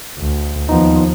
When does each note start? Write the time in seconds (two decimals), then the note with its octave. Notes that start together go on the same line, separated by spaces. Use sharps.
0.18 D2
0.69 D#2 F3 B3 D#4